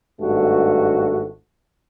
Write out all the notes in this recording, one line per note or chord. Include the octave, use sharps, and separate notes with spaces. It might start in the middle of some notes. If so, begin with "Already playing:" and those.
G#1 G2 A3 F#4